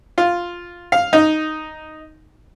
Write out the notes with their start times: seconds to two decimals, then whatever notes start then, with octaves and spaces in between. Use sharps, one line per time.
0.18 F4
0.92 F5
1.13 D#4